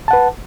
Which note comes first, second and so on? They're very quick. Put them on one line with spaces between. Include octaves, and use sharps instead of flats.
A5 F#5 B4